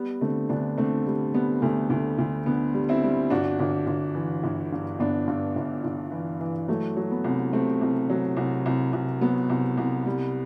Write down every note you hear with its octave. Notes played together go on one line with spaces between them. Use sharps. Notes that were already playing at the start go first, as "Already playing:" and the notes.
Already playing: G3 B3
D3 A3 C4
D2 B3 D4
D3 A3 C4
G3
G3 B3
D2 A3
D2
D2
D3 B3
G3
C4 E4
G3
G1 D4 F#4
G1
G1
E3
G1
G2
G1 B3 D4
G2
G1
G1
E3
E3
F#3 A3
F#3
B3
C2
C3 A3 C4
C2
F#3
C2
C2
C2
F#3 B3
C2
C2
G3